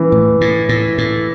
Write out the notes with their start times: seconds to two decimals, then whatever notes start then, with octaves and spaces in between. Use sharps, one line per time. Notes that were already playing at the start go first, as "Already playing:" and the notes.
Already playing: E3
0.12 A2
0.41 A2
0.69 A2
0.98 A2